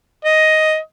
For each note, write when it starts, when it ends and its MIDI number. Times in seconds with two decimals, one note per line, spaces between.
0.25 0.78 75